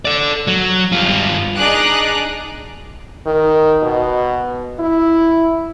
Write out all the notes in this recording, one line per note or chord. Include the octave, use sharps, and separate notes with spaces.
A4 D5
F#3
G2 F4
D4 D#4 G#4 D6 F#6
D#3
B2
E4